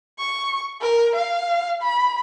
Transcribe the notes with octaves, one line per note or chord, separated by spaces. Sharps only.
C#6
A#4
F5
B5